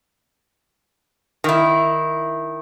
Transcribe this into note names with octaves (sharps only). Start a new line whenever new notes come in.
D#3 E4